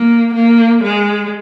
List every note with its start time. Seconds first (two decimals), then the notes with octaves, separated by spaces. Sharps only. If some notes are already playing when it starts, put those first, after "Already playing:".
Already playing: A#3
0.34 A#3
0.84 G#3